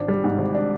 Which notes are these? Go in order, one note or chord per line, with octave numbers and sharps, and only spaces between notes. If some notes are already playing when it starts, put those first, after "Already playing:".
Already playing: G#1 D4
G3
G#2
G#1
D4